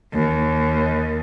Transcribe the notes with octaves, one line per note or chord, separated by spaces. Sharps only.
D#2